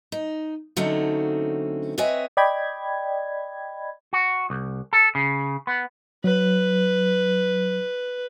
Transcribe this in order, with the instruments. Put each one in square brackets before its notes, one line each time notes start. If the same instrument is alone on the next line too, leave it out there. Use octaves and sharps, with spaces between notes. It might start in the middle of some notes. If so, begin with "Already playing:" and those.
[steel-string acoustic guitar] D#4
D3 F#3 A3 C4 C#4 D#4
C4 B4 C#5 D#5 E5 G#5
[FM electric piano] D5 D#5 G5 B5 G#6
[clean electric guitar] F#4
C2
A4
C#3
B3
[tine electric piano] F#3 [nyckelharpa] B4